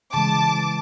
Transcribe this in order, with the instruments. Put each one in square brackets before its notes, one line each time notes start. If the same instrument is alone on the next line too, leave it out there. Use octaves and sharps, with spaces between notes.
[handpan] C#3 E3 G#3 [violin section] A5 D6